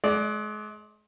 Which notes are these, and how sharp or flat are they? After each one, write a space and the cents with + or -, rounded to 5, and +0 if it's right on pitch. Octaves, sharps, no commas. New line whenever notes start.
G#3 +35 D5 +0